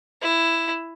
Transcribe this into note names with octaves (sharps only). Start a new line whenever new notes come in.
E4